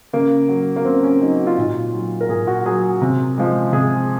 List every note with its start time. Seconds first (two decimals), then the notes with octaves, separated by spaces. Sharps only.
0.13 C#3 A#3
0.49 F#3
0.76 A#3
0.85 C#3 C4
1.03 C#4
1.21 F#3 D#4
1.40 F#4
1.47 F4
1.54 D#4
1.58 A#2 F4
1.94 F#3
2.21 A#4
2.29 A#2 G#4
2.47 F#4
2.66 F#3 G#4
2.83 G#4
3.01 C3
3.38 F3 G#3
3.73 C3 G#4